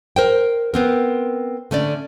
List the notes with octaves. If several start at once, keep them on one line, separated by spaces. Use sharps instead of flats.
A#4 C5 G5
B3 C4 A#4
D3 A3 C#4 D5